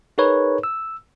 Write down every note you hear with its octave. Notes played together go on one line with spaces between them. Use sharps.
D#4 G#4 A#4 B4 C#5
E6